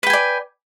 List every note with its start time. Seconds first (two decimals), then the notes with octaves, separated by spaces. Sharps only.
0.03 B4
0.06 G5
0.10 G#5
0.13 D5